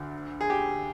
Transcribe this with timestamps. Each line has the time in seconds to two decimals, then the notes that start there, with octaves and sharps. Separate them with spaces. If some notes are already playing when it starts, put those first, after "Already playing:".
Already playing: D2 D3
0.41 G#4
0.50 G4